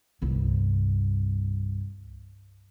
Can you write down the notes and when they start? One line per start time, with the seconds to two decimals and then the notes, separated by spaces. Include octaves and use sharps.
0.22 C2 G2